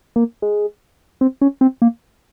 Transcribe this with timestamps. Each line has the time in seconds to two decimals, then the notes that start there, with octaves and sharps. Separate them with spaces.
0.16 A#3
0.42 G#3
1.21 C4
1.41 C#4
1.61 C4
1.82 A#3